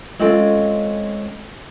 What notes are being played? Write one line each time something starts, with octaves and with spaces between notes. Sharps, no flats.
G#3 C4 C#4 F4 A4 G5